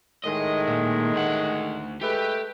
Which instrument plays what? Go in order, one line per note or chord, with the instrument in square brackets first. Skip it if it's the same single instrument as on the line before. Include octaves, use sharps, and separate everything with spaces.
[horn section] A2 D#3 G#3 [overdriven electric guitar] D#5
[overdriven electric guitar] A#2
D2 F#5
[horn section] G#3 A3 B4 [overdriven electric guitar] G4